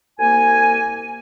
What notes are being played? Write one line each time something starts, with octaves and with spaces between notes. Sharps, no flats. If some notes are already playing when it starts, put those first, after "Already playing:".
C2 A#3 G#5